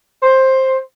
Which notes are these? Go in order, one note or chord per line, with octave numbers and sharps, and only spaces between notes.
C5